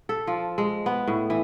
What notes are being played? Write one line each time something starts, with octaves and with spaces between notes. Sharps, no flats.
A4
F3
G#3
B3
A2
E3